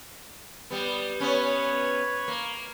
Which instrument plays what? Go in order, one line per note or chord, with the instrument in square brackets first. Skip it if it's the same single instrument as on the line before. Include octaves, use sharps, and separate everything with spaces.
[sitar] G3 B3
[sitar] B3 C#4 [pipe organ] B4 C#5 G#6
[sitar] A#3